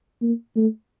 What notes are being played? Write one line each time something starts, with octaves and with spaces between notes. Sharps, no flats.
A#3
A3